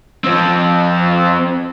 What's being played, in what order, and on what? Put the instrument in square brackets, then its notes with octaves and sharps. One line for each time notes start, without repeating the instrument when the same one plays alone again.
[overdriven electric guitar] F3 C4